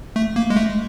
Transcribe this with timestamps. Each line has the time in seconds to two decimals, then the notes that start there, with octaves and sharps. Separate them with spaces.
0.16 A3
0.36 A#3
0.50 G#3
0.56 A3